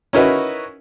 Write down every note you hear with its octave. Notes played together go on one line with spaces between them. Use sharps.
C#4 D#4 E4 F#4 A#4 B4